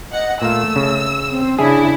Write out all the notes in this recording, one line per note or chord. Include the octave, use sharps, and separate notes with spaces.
D#5 F#5
A#2 A3 F5 E6
C#3
C4
C#3 D4 E4 G#4 E5